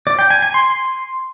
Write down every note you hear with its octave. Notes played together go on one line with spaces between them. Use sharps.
D5
G5
G#5
G#5
C6